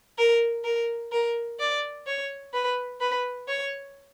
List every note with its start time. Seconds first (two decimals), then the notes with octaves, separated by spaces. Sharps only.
0.18 A#4
0.65 A#4
1.12 A#4
1.59 D5
2.06 C#5
2.53 B4
3.01 B4
3.48 C#5